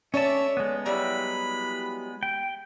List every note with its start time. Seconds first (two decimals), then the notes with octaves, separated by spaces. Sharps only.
0.14 C#4 A4 C#5 D5 E5 A5
0.57 G#3 B3
0.86 F#3 G3 E4 B5
2.23 G5